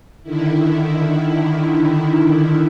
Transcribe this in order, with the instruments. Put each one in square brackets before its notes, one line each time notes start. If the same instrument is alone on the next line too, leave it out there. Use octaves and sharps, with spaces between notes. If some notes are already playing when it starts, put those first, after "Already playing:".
[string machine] D3 D#3 E4